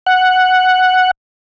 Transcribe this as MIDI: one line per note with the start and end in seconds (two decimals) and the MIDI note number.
0.06 1.11 78